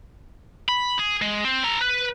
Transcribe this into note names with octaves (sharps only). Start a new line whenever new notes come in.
B5
G#4
G#3
C4 C5
A4 A#5
B4